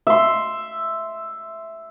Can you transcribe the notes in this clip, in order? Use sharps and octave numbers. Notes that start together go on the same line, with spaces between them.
E5 C6